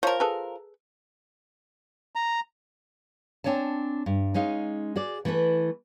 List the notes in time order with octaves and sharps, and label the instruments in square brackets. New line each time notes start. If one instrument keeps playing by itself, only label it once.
[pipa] F3 A#4 [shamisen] C5 C#5
[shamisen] G#4 A4 B4
[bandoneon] A#5
[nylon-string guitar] C4 D4 C#5 G#5 A5
G2
G#3 C#4 D#4 F5
F#4 G#4 D5
E3 A3 E4 A4 B4